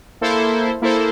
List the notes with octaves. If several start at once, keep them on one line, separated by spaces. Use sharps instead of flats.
A#3 E4 A4 C5
A#3 E4 A4 C5